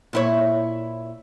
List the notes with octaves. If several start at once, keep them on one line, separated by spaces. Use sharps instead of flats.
A#2 E4 C#5